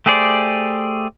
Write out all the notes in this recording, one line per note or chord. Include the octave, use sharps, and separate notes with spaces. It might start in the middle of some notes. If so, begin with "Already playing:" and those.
A3 G4 G#4 C5 D5